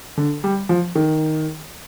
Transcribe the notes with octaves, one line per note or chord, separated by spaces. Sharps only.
D3
G3
F3
D#3